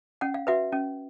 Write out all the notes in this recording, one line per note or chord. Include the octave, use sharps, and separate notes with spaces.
C#4 F#5
F5
F#4 B4 E5 F#5
C#4